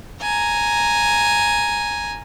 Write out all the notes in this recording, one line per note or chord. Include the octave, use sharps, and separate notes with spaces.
G#5 A#5